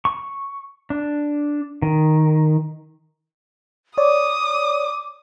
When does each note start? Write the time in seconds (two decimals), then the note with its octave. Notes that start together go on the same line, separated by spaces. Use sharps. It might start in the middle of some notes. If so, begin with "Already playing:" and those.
0.05 C#6
0.90 D4
1.82 D#3
3.98 C#5 D5 D6 D#6